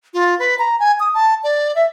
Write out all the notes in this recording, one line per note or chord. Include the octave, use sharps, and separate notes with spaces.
F4
B4
A#5
G#5
D#6
A5
D5
E5